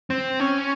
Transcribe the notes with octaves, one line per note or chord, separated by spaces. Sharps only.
C4
C#4